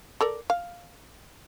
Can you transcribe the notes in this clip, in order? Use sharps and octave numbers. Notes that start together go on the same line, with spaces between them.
A4 A#4 D5
F5